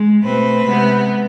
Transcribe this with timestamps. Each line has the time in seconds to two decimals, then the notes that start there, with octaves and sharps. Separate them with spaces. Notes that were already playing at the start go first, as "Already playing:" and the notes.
Already playing: G#3
0.24 B2 A3 C4 B4
0.67 C3 G#3 B3